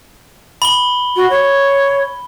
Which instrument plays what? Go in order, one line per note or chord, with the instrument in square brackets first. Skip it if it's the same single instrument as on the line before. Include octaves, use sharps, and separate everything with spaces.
[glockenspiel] B5 G7
[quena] F#4
C#5